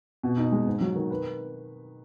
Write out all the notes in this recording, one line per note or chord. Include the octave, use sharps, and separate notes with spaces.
B2
D#4
G#3
G#2
F#3
D#3
B4